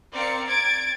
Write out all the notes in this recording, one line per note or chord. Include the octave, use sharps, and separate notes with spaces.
C4 A#4 D5 F5 C#7
G#6 A6 D7